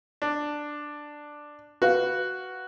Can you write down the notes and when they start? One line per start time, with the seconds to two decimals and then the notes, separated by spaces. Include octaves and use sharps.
0.22 D4
1.82 F#4 B4 F5